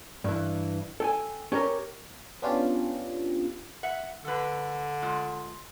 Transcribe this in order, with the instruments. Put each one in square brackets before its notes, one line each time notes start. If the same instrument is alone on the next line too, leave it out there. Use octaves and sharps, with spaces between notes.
[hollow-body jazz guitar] G2 E3
A4 G5 G#5
C#4 G4 A4 A#4 C#5
[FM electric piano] B3 C#4 D4 F4 G4
[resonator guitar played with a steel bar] E5 F#5
[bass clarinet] D3 [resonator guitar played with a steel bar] A4 B4
[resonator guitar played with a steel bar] G#3 F4